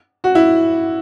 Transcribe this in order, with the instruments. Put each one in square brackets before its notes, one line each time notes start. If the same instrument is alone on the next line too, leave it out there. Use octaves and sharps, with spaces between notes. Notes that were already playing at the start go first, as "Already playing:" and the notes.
[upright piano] F#4
E4